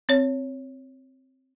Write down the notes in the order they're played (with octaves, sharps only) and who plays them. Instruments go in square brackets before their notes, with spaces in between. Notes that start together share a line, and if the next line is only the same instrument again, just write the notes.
[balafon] C4 C#5